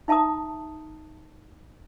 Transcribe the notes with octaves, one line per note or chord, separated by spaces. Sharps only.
D#4 E5 A5 A#5 D#6